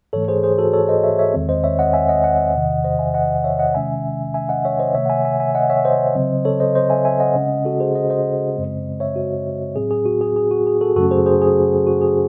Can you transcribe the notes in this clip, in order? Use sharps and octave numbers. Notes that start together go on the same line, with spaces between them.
G#2 E3 A3 A4 C#5
G#4 C5
G#4 C5
F#4 A4
A4 C#5
C5 D#5
C#5 E5
C#5 E5
E2 D#3 G#3 C4
C5 D#5
C#5 E5
D#5 F#5
E5 G#5
D#5 F#5
D#5 F#5
E2 C3 D#3
C5 D#5
E5 G#5
D#5 F#5
C#5 E5
D#5 F#5
C3 D#3 G#3 C#4 E5 G#5
E5 G#5
D#5 F#5
C#5 E5
C5 D#5
C3 D#3 A3 C#5 E5
F#5
E5 G#5
E5 G#5
E5 G#5
D#5 F#5
C#5 E5
C5 D#5
C#3 F#3 C4
A4 C#5
C5 D#5
C5 D#5
E5 G#5
E5 G#5
D#5 F#5
C#3 G#3 C#4
F#4 A4
G#4 C5
C5 D#5
C5 D#5
F#2 C#3 G#3 C4
C#5 E5
F#4
A2 F#3 C4 G#4
G#4
F#4
G#4
G#4
F#4
G#4
F#4 A4
F#2 C#3 F#3 A3 C#4 F#4 A4
G#4 C5
G#4 C5
G#4
F#4
G#4